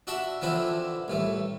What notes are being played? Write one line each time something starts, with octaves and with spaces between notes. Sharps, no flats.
D4 F#4 E5 A5 B5
D3 E3 F3 C4 D4 E4
C2 A2 E3